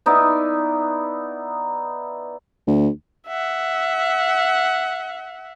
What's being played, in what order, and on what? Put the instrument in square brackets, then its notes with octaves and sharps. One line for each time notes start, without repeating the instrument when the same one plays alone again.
[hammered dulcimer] B3 D#4 E4 D5
[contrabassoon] D2
[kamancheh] E5 F#5